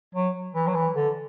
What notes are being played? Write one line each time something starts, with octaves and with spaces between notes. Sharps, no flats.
F#3
E3
F#3
E3
D3